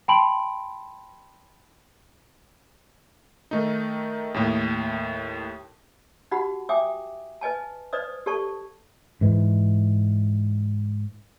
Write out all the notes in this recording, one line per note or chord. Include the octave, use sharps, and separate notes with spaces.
G5 A5 B5 C6 D7 F#7
D#3 A3 D#4
D#2 A2
D#4 F#4 G4 F#5 B5
E5 G5 G#5 D6 D#6
B4 D#5 G#5 A5
B4 C5 D5 D#5 D#6
G4 A4 D5 A5 C#6
G#2 E3